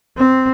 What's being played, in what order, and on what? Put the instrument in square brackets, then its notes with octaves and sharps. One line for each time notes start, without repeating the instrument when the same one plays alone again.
[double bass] C4